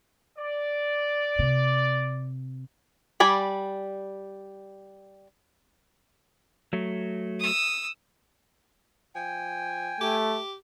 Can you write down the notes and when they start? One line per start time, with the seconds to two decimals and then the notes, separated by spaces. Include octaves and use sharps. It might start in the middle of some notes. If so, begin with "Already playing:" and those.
0.38 D5
1.39 C3
3.20 G3 D5 G#5 B5
6.73 F#3 A3
7.40 D#6 E6
9.15 F3 G5 G#5
10.01 A3 G4